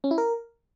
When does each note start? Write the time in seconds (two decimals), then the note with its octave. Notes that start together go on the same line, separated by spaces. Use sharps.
0.04 C#4
0.11 E4
0.18 A#4